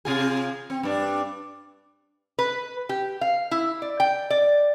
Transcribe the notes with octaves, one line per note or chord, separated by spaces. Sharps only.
C3 F4 G#4
C4
G2 D4
B4
G4
F5
E4
D5
G5
D5